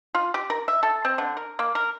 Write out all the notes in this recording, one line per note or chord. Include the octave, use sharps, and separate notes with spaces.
F4
G4
A#4
E5
A4
C4
D3
A#4
A#3
A#4